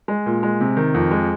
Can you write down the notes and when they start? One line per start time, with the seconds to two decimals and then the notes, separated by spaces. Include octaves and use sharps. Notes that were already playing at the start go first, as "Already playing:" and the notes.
0.08 G#3
0.26 A#2
0.43 G#3
0.60 C3
0.77 D#3
0.94 F2
1.11 G#3